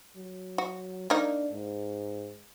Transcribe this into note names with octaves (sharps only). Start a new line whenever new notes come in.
F#3
F#4
A#3 D4 D#4
G#2